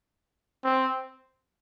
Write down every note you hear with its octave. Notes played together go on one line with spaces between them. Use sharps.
C4